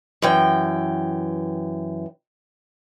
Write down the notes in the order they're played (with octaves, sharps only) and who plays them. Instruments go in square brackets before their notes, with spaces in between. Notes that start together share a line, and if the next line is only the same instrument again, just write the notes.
[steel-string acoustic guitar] F#2 E3 G5